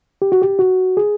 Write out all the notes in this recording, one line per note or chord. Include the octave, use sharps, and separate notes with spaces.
G4
F#4
G4
F#4
G#4